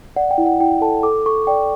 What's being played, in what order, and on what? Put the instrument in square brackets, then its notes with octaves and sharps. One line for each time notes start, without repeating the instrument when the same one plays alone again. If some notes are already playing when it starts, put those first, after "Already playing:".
[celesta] D5 F#5
G5
E4
F#5
E4 G5
A4 A5
A4 D6
A4 C#6
D5 G5